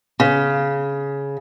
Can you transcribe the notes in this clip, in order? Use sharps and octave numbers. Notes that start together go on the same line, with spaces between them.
C#3